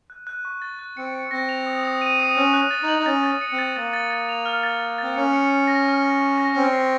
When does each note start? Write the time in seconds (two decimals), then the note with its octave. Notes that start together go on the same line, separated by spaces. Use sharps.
0.10 F#6
0.27 F#6
0.45 C#6
0.62 A6
0.79 F#6
0.97 C4 C#7
1.14 C#7
1.31 C4 A#6
1.49 F7
1.67 D#6
1.84 D#6
2.01 D#7
2.19 D#6
2.36 C#4 F#6
2.54 F#6
2.71 A6
2.83 D#4
2.88 F#7
2.99 D#4
3.06 C#4 A6
3.23 A6
3.41 C#7
3.52 C4
3.59 A6
3.76 A#3 A6
3.93 A6
4.11 A6
4.29 F7
4.46 F6
4.63 A6
4.80 F6
4.98 C4 A6
5.16 C#4 C#7
5.33 C#7
5.50 C#7
5.68 A#6
5.86 F6
6.03 A#6
6.20 C#6
6.38 A#6
6.55 C4 F6
6.72 C7